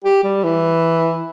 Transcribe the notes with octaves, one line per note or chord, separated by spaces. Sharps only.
G4
G3
E3